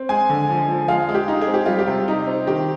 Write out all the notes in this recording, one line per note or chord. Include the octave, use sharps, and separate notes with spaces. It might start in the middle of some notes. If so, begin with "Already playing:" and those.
Already playing: C4
G#3 G#5
D3
F3
F3
G#3 F5
G#3
G4
D#4
G#4
C4
G4
G3 F4
G4
C3
D#4
C4
D#3 G4